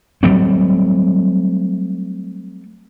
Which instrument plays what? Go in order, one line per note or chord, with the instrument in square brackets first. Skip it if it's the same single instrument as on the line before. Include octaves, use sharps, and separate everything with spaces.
[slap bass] F#3 G3 A3 C4